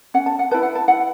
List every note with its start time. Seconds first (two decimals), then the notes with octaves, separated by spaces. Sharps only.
0.14 C#4 F#5
0.26 A5
0.39 F#5
0.51 E4 B4 A5
0.63 F#5
0.75 A5
0.88 E4 F#5